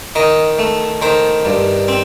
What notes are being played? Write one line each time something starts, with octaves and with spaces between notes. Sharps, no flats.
D#3 D#5
A3
D#3 C5
G2
C4